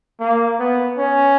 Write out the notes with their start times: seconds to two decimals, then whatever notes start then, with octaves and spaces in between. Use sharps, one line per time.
0.20 A#3
0.60 B3
0.98 C#4